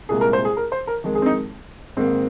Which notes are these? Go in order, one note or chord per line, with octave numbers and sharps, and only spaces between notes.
C2 A#2 G#3 G#4
A#4
C5
G#4
A#4
C5
A#4
F2 D#3 G#3
G#4
C4
D#4
G#2 D#3 A#3 C4